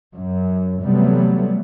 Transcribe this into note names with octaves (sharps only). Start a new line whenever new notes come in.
F#2
C3 E3 F#3 G3 A3 B3